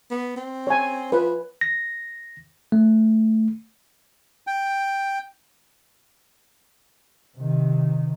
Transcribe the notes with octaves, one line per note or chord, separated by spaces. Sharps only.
B3
C4
C#5 G#5
F3 B4
A#6
A3
G5
C3 D#3